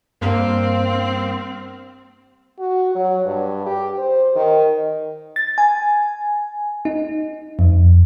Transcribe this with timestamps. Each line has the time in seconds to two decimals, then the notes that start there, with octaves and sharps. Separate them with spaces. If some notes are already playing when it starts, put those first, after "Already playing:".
0.21 G2 A#3 C4 F5
2.59 F#4
2.95 F#3
3.24 G2
3.66 G4
3.98 C5
4.36 D#3
5.36 A6
5.58 G#5
6.85 D#4
7.59 F2